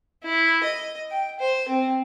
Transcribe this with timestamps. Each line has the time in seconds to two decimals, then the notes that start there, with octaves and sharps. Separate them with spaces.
0.24 E4
0.64 D#5
1.11 G5
1.40 C5
1.68 C4